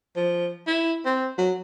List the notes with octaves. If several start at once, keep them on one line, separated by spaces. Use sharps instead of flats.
F3
E4
C4
F#3